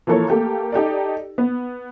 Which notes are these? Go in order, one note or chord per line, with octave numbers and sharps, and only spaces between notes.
E3 F3 A#3 A4 A#4 C#5
A3 A#3 G4 A4
D#4 G4 A4 D5
B3